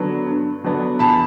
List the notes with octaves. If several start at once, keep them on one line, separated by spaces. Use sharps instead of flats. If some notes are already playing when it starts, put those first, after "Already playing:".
Already playing: D3 F#3 B3 D4
G2
D3 F#3 B3 D4
E2 A5 B5